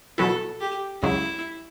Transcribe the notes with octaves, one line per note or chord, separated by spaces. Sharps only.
B2 F#3 B3 E4 A4
G4
C#2 C#3 F#3 E4